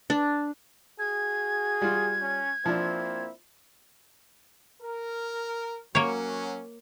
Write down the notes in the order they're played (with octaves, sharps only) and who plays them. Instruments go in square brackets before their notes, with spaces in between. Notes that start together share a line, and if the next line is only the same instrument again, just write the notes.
[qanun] D4
[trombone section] F#4 G#4 [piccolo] G#6
[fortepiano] G3 F4
[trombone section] C#4
[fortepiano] F3 D4 [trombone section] A#3 C4 E4
[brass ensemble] A#4
[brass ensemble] F#3 C#4 [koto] A#3 C#5